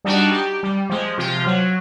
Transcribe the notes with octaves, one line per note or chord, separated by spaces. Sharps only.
G3 D4 D#4 F#4
G4
G3
F3 G#3
C3 F3 F4
F#3